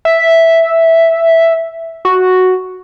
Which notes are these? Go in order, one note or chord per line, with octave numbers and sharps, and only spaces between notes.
E5
F#4